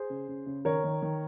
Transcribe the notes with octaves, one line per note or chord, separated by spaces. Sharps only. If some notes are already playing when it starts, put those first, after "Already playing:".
Already playing: G#4 C5
C#3
C#3
C#3
D#3 A#4 C#5
D#3
D#3